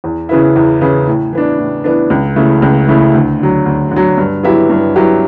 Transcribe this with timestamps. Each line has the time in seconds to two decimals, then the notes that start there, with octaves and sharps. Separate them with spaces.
0.04 E2
0.29 C#3 E3 B3 E4
0.56 E2
0.81 C#3 E3 B3 E4
1.07 A2
1.33 E3 B3 D4
1.59 A2
1.84 E3 B3 D4
2.10 C#2
2.36 C#3 E3 A3 E4
2.62 C#2
2.88 C#3 E3 A3 E4
3.14 D2
3.40 D3 F#3
3.66 D2
3.91 D3
3.96 F#3
4.18 G2
4.43 F#3 B3 E4 G4
4.69 G2
4.95 F#3 B3 E4 G4